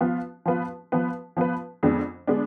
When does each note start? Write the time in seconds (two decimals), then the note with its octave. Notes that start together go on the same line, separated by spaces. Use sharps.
0.01 F3 B3 F4 B4
0.46 F3 B3 F4 B4
0.92 F3 B3 F4 B4
1.37 F3 B3 F4 B4
1.83 F2 D3 G#3 B3 D4
2.27 D3 G#3 B3 D4